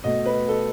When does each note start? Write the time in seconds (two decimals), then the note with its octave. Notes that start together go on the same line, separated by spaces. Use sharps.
0.04 B2 A3 D#5
0.26 B4
0.48 A4